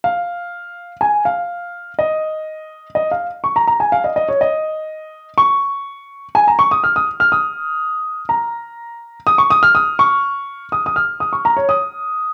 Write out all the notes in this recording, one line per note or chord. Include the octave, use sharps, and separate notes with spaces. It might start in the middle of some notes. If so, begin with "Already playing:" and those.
F5
G#5
F5
D#5
D#5
F5
C#6
A#5
A#5
G#5
F5
D#5
D#5
C#5
D#5
C#6
G#5
A#5
C#6
D#6
F6
D#6
F6
D#6
A#5
D#6
C#6
D#6
F6
D#6
C#6
D#6
D#6
F6
D#6
C#6
A#5
C#5
D#6